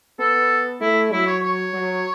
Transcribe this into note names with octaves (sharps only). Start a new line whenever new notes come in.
B3 A4
A3 E4
F#3 E4
C#5
C#5
F#3